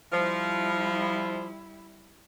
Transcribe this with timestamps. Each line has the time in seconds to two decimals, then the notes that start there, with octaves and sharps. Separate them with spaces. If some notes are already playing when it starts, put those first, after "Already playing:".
0.12 F3 G3 E4